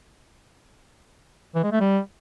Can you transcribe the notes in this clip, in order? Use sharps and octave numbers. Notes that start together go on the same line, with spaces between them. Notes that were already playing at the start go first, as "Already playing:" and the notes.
E3
G#3
A3
G3